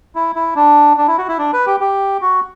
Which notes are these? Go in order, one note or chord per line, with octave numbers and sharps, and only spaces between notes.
E4
E4
D4
D4
E4
F#4
E4
D4
B4
G4
G4
F#4